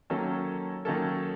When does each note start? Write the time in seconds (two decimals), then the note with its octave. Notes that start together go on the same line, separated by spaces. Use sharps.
0.10 D#3 F#3 A#3 C#4 A4
0.85 D#3 F#3 A#3 C#4 A4